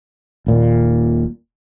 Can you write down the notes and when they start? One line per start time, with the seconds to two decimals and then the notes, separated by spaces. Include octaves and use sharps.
0.47 D#1 A#2